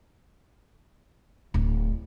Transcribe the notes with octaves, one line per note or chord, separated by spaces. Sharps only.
D1